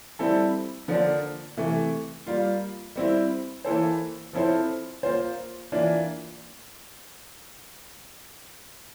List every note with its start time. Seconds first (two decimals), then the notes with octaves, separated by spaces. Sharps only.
0.19 G3 C4 E4 A4
0.88 D3 F3 A#3 D4
1.57 C3 E3 A3
2.27 G3 A#3 F4
2.96 G3 C4 E4
3.65 E3 A#3 E4 A4 C5
4.33 F3 C4 E4 A4 C5
5.03 A#3 F4 C5
5.72 E3 A#3 D4 F4